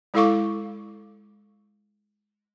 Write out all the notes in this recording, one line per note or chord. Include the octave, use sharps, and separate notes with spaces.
G#3 E4 A4 F5 C#6 D6